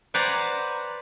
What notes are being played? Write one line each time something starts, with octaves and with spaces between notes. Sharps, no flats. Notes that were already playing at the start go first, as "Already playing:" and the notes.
B4 C5 D5 F#5 G#5 A#5